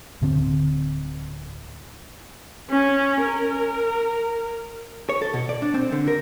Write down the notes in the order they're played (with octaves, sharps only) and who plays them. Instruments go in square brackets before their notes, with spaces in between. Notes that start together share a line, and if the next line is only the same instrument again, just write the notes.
[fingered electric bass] D1 D3 C4
[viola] C#4
A#4
[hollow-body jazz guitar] C#5
A4
B2
D5
D4
C4
D3
A#4